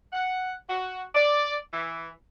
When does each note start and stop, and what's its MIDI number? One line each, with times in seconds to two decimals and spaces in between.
0.13 0.52 78
0.70 1.02 66
1.15 1.55 74
1.73 2.09 52